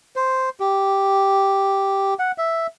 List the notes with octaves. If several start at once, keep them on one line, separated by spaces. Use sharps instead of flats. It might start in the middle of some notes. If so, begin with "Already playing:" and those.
C5
G4
F#5
E5